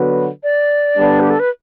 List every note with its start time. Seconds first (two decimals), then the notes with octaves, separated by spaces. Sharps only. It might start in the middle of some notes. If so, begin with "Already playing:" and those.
Already playing: D3 F#3 B3 F#4 B4
0.43 D5
0.96 D3 G3 B3 D4
1.20 G4
1.30 A4
1.40 B4